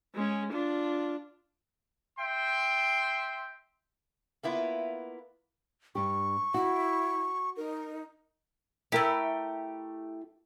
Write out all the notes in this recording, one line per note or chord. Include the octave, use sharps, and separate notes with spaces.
G#3 C#4
D4 F4
E5 G5 C6
A#3 B3 E4 F4
G2 G4 C#6
E4 F#4
D#4 A#4
A3 E4 G4 A#4 E5